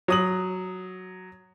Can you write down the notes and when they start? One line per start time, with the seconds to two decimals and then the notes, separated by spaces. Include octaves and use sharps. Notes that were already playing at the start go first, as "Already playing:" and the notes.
0.08 F#3 D#6 F#7